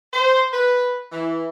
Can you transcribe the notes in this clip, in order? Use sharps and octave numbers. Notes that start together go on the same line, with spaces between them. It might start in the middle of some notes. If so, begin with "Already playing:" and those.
C5
B4
E3